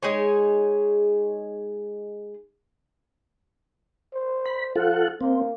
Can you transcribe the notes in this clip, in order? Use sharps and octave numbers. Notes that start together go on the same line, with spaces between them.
G#3 D#4 G#4 C#5
C5
B5
F3 F4 A4 F#5
A#3 C4